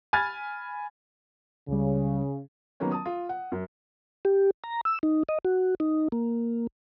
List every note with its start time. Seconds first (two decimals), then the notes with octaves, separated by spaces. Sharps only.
0.13 G#5 B5 F6 G#6 A6
1.69 C#2 C#3 G3
2.80 D#3 F#3 A#3 B3 C#4
2.92 A5 D#6
3.05 F4
3.29 F#5
3.52 F#2
4.25 G4
4.64 A#5
4.85 E6
5.03 D#4
5.29 D#5
5.45 F#4
5.80 D#4
6.12 A#3